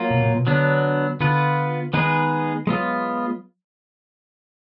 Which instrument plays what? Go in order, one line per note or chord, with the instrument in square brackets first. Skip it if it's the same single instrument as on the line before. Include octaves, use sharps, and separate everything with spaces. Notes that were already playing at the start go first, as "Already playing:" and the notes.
Already playing: [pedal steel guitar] F#3 A#3 F4
[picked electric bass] B2
A#2
B2
[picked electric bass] D3 [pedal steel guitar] F#3 B3 D4
[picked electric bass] D3 [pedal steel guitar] B3 F4 B4
[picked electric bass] D#3 [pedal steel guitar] G#3 B3 D#4 G#4 B4
[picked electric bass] F#3 [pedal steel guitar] G#3 B3 F4